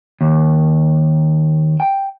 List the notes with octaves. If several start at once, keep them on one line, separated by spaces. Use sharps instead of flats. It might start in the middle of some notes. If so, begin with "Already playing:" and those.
D#2
G5